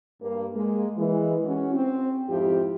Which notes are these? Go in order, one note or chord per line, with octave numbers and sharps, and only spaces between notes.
G2 A#3
G#3 A#3
E3 G#3
C#4 F#4
C4
F2 G#2 F3 E4 F4 G4